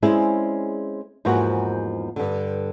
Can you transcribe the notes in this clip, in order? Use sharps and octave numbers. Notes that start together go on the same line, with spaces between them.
G#3 C4 C#4 E4 G#4 D5
E2 G#2 F3 A#3 C4 F#4
G2 D3